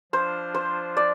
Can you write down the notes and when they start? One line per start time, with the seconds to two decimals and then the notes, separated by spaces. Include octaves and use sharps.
0.12 F3 D4 F4 C5
0.55 C5
0.97 D5